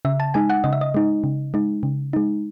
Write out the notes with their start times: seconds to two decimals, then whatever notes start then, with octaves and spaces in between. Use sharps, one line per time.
0.05 C#3 E5
0.20 A5
0.34 G#3 D#4 G#5
0.50 F#5
0.64 C#3 D#5
0.73 E5
0.81 D#5
0.94 G#3 D#4
1.24 C#3
1.54 G#3 D#4
1.83 C#3
2.13 G#3 D#4